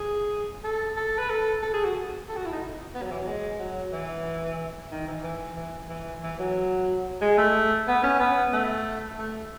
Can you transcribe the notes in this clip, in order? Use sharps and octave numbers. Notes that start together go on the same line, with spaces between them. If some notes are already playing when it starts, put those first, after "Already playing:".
Already playing: G#4
A4
A4
B4
A4
A4
G#4
F#4
A4
F#4
E4
D#4
B3
F#3
E3
F#3
G#3
F#3
E3
D#3
E3
E3
E3
E3
E3
F#3
G#3
A3
B3
C#4
B3
A3
A3